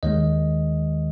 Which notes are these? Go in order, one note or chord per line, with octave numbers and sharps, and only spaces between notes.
D#2 D#3 G#3 D#5